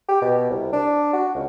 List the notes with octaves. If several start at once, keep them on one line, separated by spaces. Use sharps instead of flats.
G4
B2
C2
D4
F#4
C#2